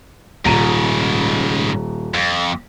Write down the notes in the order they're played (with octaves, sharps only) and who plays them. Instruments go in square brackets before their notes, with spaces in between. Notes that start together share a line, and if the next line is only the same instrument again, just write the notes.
[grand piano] D#1 A#5 D#7 [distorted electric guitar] G#2 C#3
[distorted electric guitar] F2